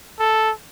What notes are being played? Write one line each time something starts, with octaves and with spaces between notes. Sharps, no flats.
A4